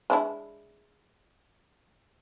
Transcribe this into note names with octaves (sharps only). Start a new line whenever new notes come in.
G#3 D4 E4